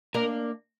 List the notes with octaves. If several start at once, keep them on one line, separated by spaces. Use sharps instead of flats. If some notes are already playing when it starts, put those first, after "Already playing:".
A#3 D4 A#4